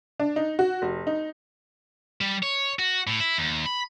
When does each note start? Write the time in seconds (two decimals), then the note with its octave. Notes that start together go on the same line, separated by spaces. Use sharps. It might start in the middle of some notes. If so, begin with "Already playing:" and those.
0.20 D4
0.36 D#4
0.59 F#4
0.82 F1
1.07 D#4
2.21 G3
2.43 C#5
2.79 F#4
3.07 A2
3.20 E4
3.38 D#2
3.66 B5